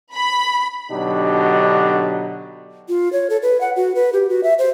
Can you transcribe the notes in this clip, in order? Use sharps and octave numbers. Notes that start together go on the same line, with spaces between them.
B5
B2 D3 F#3 D4 D#4 G4
F4
C#5
A4
B4
F#5
F#4
B4
G4
F#4
E5
C5